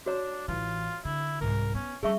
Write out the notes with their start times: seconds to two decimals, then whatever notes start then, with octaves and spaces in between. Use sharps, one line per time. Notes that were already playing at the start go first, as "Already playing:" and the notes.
0.06 D4 F#4 C#5 A#5
0.48 A1 E3 F4
1.05 D3 E4
1.41 C2 G#2 A#4
1.75 B3 C#4
2.03 G3 A3 C#4 G#4 E5 C#6